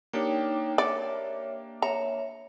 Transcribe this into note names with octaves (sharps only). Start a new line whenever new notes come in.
A#3 D4 D#4 G4 C#5 G5
C#5 D5 E5
C#5 E5 A#5